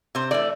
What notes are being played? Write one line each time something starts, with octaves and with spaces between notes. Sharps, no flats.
C3 C5
E3 A3 D5